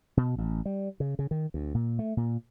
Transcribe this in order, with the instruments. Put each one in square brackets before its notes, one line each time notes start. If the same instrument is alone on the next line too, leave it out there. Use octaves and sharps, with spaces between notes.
[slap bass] B2
A1
G3
C#3
C#3
D#3
D2
A#2
A3
A#2